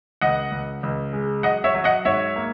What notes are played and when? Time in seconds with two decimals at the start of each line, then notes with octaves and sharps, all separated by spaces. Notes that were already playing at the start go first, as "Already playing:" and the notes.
0.21 C#2 D#5 F#5
0.51 C#2
0.83 C#2
1.13 G#3
1.43 F#3 D#5 F#5
1.64 C#5 E5
1.75 F#3
1.84 D#5 F#5
2.05 G#2 C#5 E5
2.36 A#3